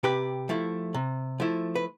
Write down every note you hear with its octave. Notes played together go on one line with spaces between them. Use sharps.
C3 G4 B4
F3 A3 E4
C3
F3 A3 E4
B4